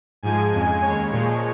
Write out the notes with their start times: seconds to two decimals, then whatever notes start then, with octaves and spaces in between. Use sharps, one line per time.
0.23 G#2 F3 G#3 G#5
0.53 F2 C#3 G#3
0.82 D#2 C#3 G#3 C#5
1.12 A#2 F3 G#3